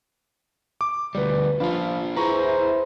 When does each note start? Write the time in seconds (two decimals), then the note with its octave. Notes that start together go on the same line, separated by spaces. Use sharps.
0.81 D6
1.15 D2 G3 B4 D5
1.60 F3 D4 F4 F5 B5
2.16 E4 G#4 B4 C5 A#5 C#6